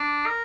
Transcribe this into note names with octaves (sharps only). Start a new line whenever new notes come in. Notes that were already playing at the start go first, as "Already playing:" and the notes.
Already playing: D4
A#4